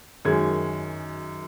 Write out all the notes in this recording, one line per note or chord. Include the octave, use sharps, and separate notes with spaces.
F#2 D#3 G#3 G#6